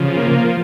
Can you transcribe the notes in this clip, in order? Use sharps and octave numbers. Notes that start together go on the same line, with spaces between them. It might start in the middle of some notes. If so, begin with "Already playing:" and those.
Already playing: C#3 F3
A#3